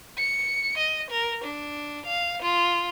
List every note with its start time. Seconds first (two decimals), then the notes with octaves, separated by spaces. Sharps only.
0.18 C#7
0.78 D#5
1.10 A#4
1.44 D4
2.05 F5
2.42 F4